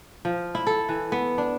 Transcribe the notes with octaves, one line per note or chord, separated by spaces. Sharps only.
F3
E4
A4
E3
B3
D4